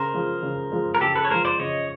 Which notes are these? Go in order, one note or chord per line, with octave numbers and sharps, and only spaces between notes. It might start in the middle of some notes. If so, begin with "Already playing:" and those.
Already playing: C#3 A#4 C5
F3 G#3
C#3
F3 G#3
A#4
C#3 G4 A4
A4 B4
C#5
F3 G#3 A#4 C5
C5 D5
C#3 C#5 D#5